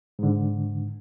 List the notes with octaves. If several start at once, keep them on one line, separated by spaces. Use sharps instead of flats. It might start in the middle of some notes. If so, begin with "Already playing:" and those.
G#2 D3